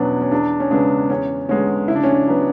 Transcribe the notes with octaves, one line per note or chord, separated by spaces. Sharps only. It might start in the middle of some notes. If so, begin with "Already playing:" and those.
Already playing: E2 B2 F#3 B3 C#4 D4
C#4
E2 D4
C#4
C#3 G#3 B3 D4
E2 C#4
D3 G#3 B3 C#4
C#3 E4
D4
C#4
D4
F#3 B3